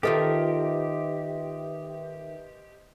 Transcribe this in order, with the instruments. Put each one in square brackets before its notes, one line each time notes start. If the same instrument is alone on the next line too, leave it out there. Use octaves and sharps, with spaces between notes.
[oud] D#3 F4 A4 [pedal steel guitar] G4 [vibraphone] B4 E5 [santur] C5 D#5